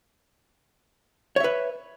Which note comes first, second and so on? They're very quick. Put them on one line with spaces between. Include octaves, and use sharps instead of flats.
C#5 E5 B4